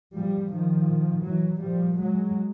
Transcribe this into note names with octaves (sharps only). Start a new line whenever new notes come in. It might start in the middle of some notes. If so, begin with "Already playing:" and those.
A#2 F3 G3
D#3 F3
A#2
E3 F#3
A#2 F3 G3
F#3 G#3